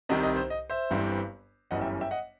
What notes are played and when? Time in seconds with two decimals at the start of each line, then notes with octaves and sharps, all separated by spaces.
0.09 C2 C3 D#3 D#5
0.23 D#5
0.36 C5
0.50 D#5
0.70 C5 E5
0.90 G1 G2 E3 G3 C4
1.71 G1 F#2 E3 G3 D#5 F#5
1.81 E5 G5
2.01 E5 G5
2.11 D#5 F#5